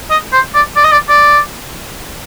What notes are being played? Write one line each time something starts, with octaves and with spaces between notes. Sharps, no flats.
D#5
C5
D5
D5
D#5
D5
D5